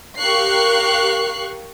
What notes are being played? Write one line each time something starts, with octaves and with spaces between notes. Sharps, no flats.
G4 A#4 F5 C#6 F#6 C7